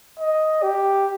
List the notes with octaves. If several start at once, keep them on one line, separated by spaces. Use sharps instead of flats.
D#5
G4